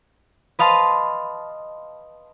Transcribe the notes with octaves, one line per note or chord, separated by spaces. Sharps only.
B4 D#5 F5 A5 C6